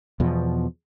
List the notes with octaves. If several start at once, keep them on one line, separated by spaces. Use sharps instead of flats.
E2 B2 F3